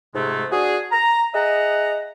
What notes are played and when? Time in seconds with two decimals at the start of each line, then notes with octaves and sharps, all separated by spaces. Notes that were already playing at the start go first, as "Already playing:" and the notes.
0.15 F2 G#2 C3 G#3 A3
0.52 D4 F#4 G#4
0.92 A#5
1.34 G#4 D#5 E5 F#5 A#5